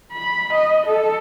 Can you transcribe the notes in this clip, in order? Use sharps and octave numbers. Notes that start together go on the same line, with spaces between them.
B5
D#5
A4